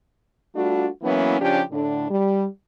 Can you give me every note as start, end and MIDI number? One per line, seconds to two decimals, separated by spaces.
0.55 0.87 55
0.55 0.87 57
0.55 0.87 62
0.55 0.87 65
0.55 0.87 66
1.03 1.39 52
1.03 1.39 54
1.03 1.39 58
1.03 1.39 59
1.03 1.39 61
1.03 1.39 64
1.40 1.62 49
1.40 1.62 53
1.40 1.62 61
1.40 1.62 62
1.40 1.62 67
1.71 2.08 45
1.71 2.08 50
1.71 2.08 62
2.10 2.46 55